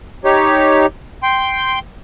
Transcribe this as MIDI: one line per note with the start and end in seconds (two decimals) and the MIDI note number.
0.25 0.86 63
0.25 0.86 67
0.25 0.86 73
1.23 1.79 79
1.23 1.79 84